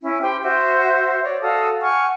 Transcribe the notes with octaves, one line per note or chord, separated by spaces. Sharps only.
C#4 E4
G4 C5 G5
F#4 C5 E5 G6
C#5 D5
F#4 A4 F5 D#6
F#5 G#5 C#6 F6